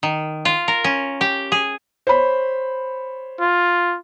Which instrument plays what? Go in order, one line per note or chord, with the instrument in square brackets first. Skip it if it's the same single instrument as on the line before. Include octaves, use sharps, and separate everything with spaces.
[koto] D#3
F4
A#4
C#4
G4
G#4
[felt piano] C5 C#5 B5
[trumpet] F4